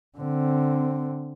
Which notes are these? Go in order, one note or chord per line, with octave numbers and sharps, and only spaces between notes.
D3 C4